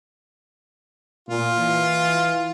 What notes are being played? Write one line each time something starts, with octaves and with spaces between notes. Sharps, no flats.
A#2 F4
E3